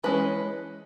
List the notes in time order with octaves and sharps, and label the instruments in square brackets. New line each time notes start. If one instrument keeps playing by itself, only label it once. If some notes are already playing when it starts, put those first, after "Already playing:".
[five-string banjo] E3 G#3 C#4 B4